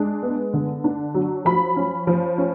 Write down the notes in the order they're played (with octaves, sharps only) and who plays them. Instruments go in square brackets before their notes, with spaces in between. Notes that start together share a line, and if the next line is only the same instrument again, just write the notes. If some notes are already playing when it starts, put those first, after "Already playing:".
Already playing: [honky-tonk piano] G#3 D4
B3
D3
D4
F#3
F3 B5
C#4
F3
C#4